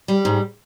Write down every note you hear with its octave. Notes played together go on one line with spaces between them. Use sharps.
G3
G#2